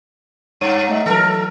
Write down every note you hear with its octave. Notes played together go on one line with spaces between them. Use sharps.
G2 C#5 D#7
A3 D#5 E5
E3 F#3 A4 A#4